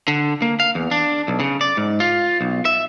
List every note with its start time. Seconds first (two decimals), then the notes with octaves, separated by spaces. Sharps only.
0.08 D3
0.42 A#3
0.60 F5
0.75 E2
0.91 D4
1.28 B1
1.40 C#3
1.61 D5
1.77 G#2
2.00 F4
2.41 B1
2.65 E5